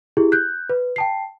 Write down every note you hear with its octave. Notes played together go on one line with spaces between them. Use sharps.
E4 G4 G#4
F#6 G6
B4
G5 A5 C7